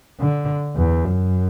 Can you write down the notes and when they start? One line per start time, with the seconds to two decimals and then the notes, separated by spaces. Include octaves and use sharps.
0.20 D3
0.77 E2
1.05 F#2